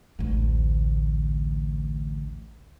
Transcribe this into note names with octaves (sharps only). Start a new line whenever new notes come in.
A1 D2